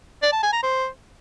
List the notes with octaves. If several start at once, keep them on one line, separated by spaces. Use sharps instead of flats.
D5
A5
G#5
A#5
C5